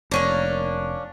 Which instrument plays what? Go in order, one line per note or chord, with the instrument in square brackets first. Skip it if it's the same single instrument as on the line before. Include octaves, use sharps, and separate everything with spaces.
[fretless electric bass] F1 [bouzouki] A#3 C#4 D4